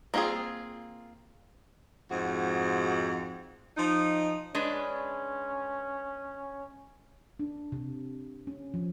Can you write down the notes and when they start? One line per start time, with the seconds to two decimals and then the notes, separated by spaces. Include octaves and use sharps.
0.14 A#3 C4 F4 F#4 G#4
2.11 F2 G#2 F#4
3.77 F3 D#4
4.55 G#3 C#4 D4 B4
7.39 D4
7.72 C3
8.47 C#4
8.74 F3